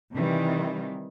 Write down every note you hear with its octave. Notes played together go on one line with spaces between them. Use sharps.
C3 D#3 E3 G3